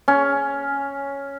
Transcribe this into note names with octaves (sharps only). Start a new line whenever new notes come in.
C#4